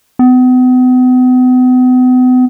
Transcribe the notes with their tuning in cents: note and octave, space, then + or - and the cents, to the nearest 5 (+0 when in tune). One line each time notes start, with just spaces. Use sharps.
B3 +40